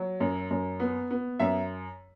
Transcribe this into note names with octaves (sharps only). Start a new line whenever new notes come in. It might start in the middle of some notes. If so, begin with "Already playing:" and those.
Already playing: F#3
F#2
F#2
B3
B3
F#2 E5